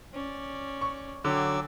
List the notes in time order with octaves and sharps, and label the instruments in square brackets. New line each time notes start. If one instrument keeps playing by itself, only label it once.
[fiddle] C#4 D5
[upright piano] C#6
[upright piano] D3 [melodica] F#3 D6 E6 [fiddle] G5 G#5